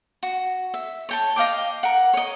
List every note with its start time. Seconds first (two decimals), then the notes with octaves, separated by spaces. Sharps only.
0.23 F#4
0.74 E5
1.09 C#5 G5 A5
1.36 D#5 F5 G5 D6
1.83 A#4 F#5
2.14 C#5 D#5